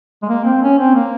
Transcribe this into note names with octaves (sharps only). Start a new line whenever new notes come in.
G#3
A#3
C4
C#4
C4
A#3